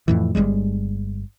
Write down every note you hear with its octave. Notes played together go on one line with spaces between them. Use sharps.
F2 A2 E3
G1 C2 G3 G#3